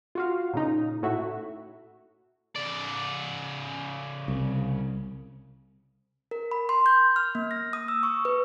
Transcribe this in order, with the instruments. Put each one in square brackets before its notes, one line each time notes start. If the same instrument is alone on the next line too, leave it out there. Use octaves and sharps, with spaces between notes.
[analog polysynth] F4 F#4 F5
A#2 C#3 D#4
A2 F#4 E5
[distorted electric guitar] C#3 D5
[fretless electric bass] C2
[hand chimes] A#4
B5
C6
G6
F6
A#3
A#6
D#6
E6
C#6
B4